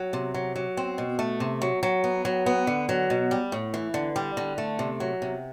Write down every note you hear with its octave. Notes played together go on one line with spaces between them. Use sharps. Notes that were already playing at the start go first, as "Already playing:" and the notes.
Already playing: F#3
C3
F#3
F#3
C4
B2
A3
C3
F#3
F#3
B3
F#3
B3
D3
F#3
B2
G3
A2
E3
D3
G3
D3
A3
C3
F#3
C3